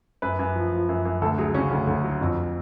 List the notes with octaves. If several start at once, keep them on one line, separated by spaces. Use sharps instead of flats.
F#2 B4
F#2
F3
F3
F#2
F#2
D2 A4
F#3 G#4
C#3 C#4
D2
D2
F#3
F2